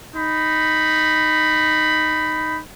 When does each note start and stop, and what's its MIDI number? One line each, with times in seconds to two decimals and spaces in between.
0.16 2.60 63
0.16 2.60 83